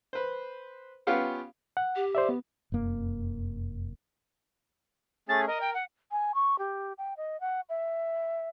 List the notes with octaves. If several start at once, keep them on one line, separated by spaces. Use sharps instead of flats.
B4 C5
B3 C#4 F4 G4 F5 F#5
F#5
G4
C5 D5 E5
B3
F1 F#2 A#3
A3 C#4 G#4 A6
A#4 D#5
G5
F#5
G#5
C#6
G4
G5
D#5
F#5
E5